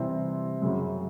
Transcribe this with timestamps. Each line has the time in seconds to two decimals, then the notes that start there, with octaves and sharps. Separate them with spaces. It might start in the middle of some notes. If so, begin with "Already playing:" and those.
Already playing: C3 E3 G3 C4
0.62 F#2 C#3 F#3